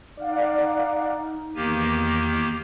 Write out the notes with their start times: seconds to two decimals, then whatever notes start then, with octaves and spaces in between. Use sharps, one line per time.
0.17 D#4 D5 F5 F#5
1.55 E2 D#3 A#3 G4 D#7